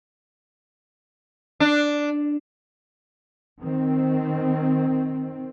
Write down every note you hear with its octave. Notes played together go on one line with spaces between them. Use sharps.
D4
D#3 C4